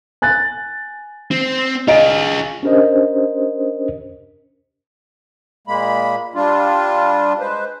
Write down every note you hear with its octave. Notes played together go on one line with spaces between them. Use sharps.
G#5 F#6 A6
C4
F4 G#4 D#5 A#5 D7
C#4 D4 G4 A#4 C5 D#5
A#2 G#3 A#3 B5
G3 D4 F4
G#3 B4 C5